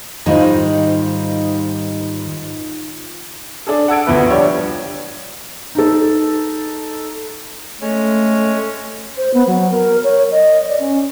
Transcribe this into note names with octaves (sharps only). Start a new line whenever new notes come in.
G#2 D#3 G3 D#4 F4 C5
D4 G#4 A4
F#5 A5 E6 G#6 D7
D#1 D2 F3 B3 B4 E5
F3 G3 D4 C#5
D#4 A4
G#3 A3 C#4 C#5
C5
B3
F#3
A#4
C#5
D#5
D5
C#4